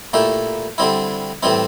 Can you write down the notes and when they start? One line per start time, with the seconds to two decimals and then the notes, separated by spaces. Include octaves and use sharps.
0.13 A#2 A3 E4 G4
0.78 D3 G3 C4 E4
1.43 A2 E3 G3 C4 E4